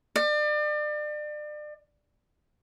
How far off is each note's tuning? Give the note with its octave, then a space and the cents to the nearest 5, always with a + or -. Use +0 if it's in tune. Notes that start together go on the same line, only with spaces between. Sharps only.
D5 +35